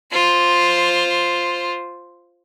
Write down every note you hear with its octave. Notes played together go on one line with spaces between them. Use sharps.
F4 C5